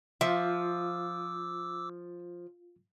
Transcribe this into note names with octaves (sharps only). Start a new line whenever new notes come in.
F3 F4 E5 D6 E6